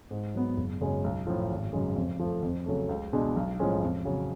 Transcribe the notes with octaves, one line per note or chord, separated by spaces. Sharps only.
G#2
F#3 B3
F#1
F#2 C#3 G#3 C#4
B1
A2 F3
G#1
F#2 C#3 G#3
F2
F3 A3
F2
C#3 F#3 A3
C#2
B2 G#3 D4
B1
A2 F3 G#3 C#4
F2
C#3 F#3